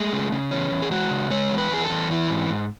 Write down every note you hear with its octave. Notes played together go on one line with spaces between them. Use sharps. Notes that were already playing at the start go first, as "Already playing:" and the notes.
Already playing: G#3 A3
C#3
C#3
E2 C#4
E2
G#4
G#3 F#4
C#3
G#3 C#5
E2
B4
E2 G#4
A4
E2
E3
G#2
G#2